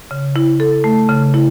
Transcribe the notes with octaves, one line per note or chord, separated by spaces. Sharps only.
C#3
E4
A4
A3
C#3
E4